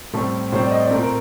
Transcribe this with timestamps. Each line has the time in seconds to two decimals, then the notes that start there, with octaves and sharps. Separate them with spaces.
0.13 A2 G3 C4 A4
0.52 A2 G3 C4 C5
0.62 D5
0.71 D#5
0.81 D5
0.90 A#2 A3 C4 A#4
1.03 A#4